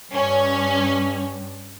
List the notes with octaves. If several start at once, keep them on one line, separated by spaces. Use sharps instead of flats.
G2 C#4